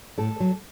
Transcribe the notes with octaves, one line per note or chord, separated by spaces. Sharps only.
A2 A4
F#3